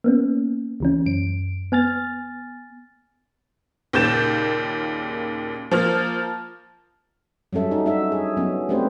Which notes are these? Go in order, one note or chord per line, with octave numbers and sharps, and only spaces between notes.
A#3 B3 C#4
C#2 E3 C#4
F#2 D7
B3 G#5 F6 A6
D#2 A#2 C#3 G6 A6 E7
F3 A#3 F6
F#3 G3 C#4 A4 E5
D#4
D4 D#4 F#4 E5
G#4
F#3 B3 C#4
A3 C4 D4 G4 B4 C5